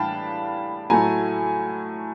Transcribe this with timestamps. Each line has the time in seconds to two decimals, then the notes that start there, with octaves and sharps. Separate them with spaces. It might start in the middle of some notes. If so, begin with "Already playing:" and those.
Already playing: A2 E3 G3 D4 F5 G5 A5 B5
0.90 A2 F#3 A3 G#5 A#5